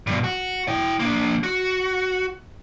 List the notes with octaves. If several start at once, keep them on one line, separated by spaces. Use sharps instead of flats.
G2 B2
F#4
E4 G5
A#3 D4
F#4